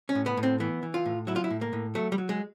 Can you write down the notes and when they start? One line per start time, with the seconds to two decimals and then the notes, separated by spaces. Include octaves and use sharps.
0.09 C#4
0.15 A2
0.26 B3
0.37 A2
0.43 C4
0.60 E3 B3
0.83 E3
0.94 F4
1.06 A2
1.27 F#3 E4
1.36 F4
1.44 E4
1.50 A2
1.61 A#3
1.73 A2
1.95 F#3 A3
2.12 G3
2.18 F#3
2.29 G#3